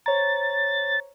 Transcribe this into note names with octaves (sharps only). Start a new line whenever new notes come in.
C5 C#5 A#5 A6